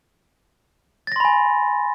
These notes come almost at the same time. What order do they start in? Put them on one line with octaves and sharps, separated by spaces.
A6 A#6 C6 B5 G#5